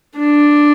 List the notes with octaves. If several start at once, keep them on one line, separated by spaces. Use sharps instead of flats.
D4